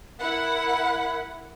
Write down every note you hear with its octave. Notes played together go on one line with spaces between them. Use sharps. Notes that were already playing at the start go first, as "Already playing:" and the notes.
E4 A#4 F#5 B5